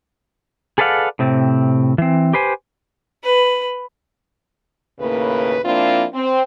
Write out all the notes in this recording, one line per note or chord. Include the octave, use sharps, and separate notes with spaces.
G#4 A4 B4 D5 F5 F#5
A2 C3 C4
E3 C4
G4 B4 C5 G#5
B4
D#2 A2 C#3 A#3 B4
F3 A#3 C4 D4 E4 F4
C4